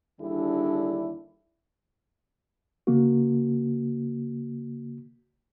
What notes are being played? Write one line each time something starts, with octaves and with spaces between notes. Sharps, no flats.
D#2 D3 G3 D4 E4 G#4
C#3 A#3 F#4